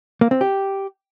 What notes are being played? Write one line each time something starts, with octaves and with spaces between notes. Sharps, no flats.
A#3
C4
G4